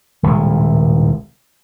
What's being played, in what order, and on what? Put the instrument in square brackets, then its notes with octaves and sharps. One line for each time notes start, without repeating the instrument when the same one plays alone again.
[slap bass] D#1 C2 A2 G#3